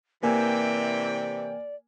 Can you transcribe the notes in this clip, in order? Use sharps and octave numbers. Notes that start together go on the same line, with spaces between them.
C3 E3 A#3 D5 G5 G#5